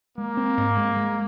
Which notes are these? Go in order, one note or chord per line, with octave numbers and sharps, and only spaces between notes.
G#3 A#3
C4
G#2
G#3
G#3